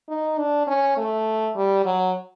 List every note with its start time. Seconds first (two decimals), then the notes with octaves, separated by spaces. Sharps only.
0.09 D#4
0.38 D4
0.67 C#4
0.97 A3
1.56 G3
1.85 F#3